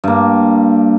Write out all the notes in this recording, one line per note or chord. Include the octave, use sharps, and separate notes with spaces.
G2 A#3